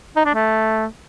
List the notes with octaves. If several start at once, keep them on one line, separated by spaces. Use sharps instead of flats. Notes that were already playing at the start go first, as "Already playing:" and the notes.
D#4
D4
A3